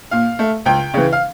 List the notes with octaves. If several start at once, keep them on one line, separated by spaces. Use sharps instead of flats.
A#2 F5
A3
C#2 G5
C#3 E3
F5